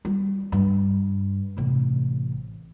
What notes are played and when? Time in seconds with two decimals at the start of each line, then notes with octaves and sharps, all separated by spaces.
0.05 G3
0.52 G2
1.57 A1 C3